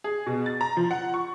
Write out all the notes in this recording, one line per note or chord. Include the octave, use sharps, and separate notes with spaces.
G#4
B2
A6
A#5
F3
F#5
C#6